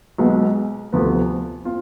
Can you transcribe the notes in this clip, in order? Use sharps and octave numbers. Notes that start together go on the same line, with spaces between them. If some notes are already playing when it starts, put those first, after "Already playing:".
B1 B2 G#3 B3
D2 C3 F3 B3
C4 F4